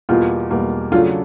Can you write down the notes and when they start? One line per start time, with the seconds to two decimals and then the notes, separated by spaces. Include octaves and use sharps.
0.09 E2 B2 G3 A#3 F4
0.50 E2 B2 G3 A#3
0.92 C#3 F#3 A3 D4 F4